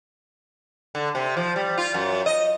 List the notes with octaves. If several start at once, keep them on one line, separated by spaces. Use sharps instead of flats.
D3
C3
F3
G3
F4
F#2
D#5